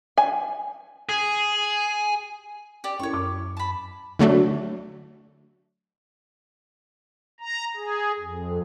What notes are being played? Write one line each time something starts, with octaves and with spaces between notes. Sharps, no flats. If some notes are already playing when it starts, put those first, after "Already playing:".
G#5
G#4
G4 D5
C#4 E4 A#4 C#5 C#6
F#2 D6
A5 B5
D3 F#3 A3 D4 F#4
A#5
G#4
F2